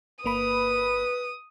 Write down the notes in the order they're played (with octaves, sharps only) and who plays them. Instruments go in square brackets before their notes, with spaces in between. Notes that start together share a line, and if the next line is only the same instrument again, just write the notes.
[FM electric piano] G1 A#3 B5 [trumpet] B4 [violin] D#6